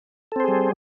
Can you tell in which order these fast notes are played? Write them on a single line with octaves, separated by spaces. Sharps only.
A4 C4 C5 G#4 G3